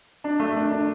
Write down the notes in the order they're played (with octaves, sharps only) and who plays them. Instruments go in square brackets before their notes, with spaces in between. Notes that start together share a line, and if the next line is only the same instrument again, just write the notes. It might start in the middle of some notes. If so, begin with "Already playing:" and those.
[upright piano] D4
A3
D4
D4